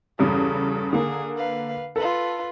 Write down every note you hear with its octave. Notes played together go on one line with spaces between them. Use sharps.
E2 G2 C#3 A4
D3 A#3 G#4
B4 F5
F4 A4 B4